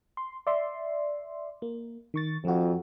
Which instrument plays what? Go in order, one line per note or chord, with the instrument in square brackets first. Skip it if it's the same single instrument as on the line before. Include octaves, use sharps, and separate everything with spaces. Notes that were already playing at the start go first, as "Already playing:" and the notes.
[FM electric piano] C6
D5 E5 C6
A#3
D#3 C#6 A6
[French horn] F2 [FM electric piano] F3 F#4